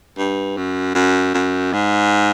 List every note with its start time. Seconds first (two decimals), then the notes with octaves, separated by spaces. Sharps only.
0.18 G2
0.57 F#2
0.95 F#2
1.34 F#2
1.73 G#2